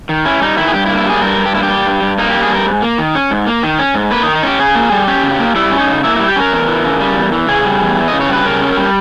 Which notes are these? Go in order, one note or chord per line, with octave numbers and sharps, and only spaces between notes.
D#3
C#4 E4
G3 D#4
D#3 E4
G#4
G2 G4
E4
A#3
E4
G3 G#4
G2 A#4
G2
G4
A#3 E4
G4
G3
G2
G2
A#3 D#4
G3 G4
G#4
G2 A#4
G#2
A#3
D#3
C#4
G#2
A#3
D#3
C#4
G#2
A#3 B4
D#4
D#3
D#4
C#4 G4
C#3 G#4
A#3
G3
C#4 G4
C#3
A#3
G3 E4
C#4
D#4
C#3
A#3 E4
G3 E4
G4
C#4 A#4
E2
E3
C#3
G3
E2
E3
C#3 G#4
G3
E2
E3
C#3 D#5
C#5
G3 B4
C#3 A#4
C#4
G3